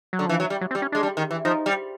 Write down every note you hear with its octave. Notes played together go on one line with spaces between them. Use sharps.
F#3
D3
E3 F3
E3 F#3
G3
F#3
C4
G3
C#4
G#3 D4
G3
D#3
E3
F3 D#4
G3